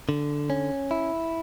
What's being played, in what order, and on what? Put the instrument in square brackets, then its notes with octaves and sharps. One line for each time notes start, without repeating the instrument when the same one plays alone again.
[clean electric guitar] D3
C#4
E4